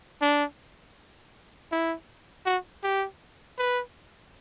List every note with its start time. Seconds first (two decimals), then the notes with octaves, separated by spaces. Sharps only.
0.22 D4
1.72 E4
2.46 F#4
2.83 G4
3.58 B4